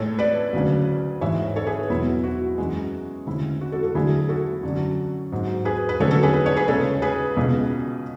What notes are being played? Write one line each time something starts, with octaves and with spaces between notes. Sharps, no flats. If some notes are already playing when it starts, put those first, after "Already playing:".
Already playing: A2 G#3 A4 C#5
B4 D5
D2 C#3 F#3
G#2 E3 G#3 C#5 E5
A4 C#5
G#4 B4
E2 B2 F#3 E4
F#4
F#2 E3 G#3
D2 C#3 G#3 E4
F#4
F#4 A4
F#4 A4
D2 D3 F#3 E4 G#4
F#4 A4
F#2 D3 F#3
G#2 F#3
G#4 B4
B4
D2 C#3 F#3 A4 C#5
F#4 A4
G#4 B4
B4
C#5
G#4 B4
C#2 C#3 G#3 A4 C#5
G#4 B4
C#2 B2 G#3